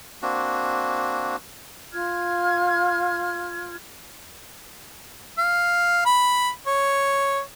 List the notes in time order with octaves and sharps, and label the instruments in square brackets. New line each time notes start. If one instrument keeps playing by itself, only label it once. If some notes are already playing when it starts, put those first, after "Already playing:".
[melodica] A#3 C4 D4 F#4
[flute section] F4 F6 G#6
[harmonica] F5
B5
C#5